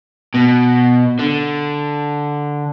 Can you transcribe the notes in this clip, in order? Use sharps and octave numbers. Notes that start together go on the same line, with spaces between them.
B2
D3